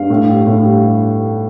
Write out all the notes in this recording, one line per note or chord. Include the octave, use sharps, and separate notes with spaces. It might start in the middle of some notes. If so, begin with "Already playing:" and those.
Already playing: G2 F5
A2
G3
A2
G3